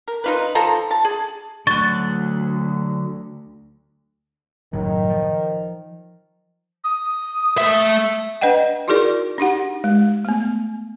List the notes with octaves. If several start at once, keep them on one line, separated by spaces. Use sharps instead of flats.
A#4
D#4 F4 B4
F3 F4 A4 A#5
A5
G#4
D2 D3 F#3 F#5 C#6 A6
F#1 A2 D#3 F#3
F3
D#6
A3 E5
D4 B4 D5 D#5 F#5 G5
D#4 E4 F#4 G#4 A#4 D5
D4 D#4 G4 F#5
G#3
A3 B3